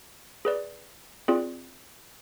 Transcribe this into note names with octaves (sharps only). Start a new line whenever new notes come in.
G#4 B4 D5
C4 F4 G#4 D5